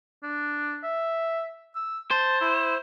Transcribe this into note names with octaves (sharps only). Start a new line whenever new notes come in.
D4
E5
E6
C5 A5
E4